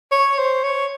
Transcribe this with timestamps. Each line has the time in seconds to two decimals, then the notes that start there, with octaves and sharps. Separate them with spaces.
0.12 C#5
0.38 C5
0.64 C#5